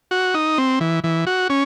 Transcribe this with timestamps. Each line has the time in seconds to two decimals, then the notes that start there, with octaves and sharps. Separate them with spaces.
0.11 F#4
0.34 D#4
0.58 C4
0.80 E3
1.04 E3
1.27 F#4
1.50 C#4